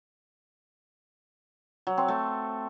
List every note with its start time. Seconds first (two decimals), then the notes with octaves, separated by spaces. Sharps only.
1.87 F#3
1.98 C4
2.08 A3